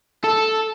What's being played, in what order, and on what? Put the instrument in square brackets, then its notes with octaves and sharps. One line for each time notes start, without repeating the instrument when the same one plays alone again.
[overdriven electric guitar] A4